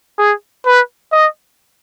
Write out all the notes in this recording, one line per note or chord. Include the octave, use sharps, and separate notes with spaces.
G#4
B4
D#5